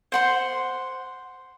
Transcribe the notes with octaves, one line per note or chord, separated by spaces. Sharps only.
C5 F#5 C6